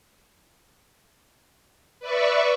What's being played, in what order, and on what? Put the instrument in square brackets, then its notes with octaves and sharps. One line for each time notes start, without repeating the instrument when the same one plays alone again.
[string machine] B4 D5 E5 C#6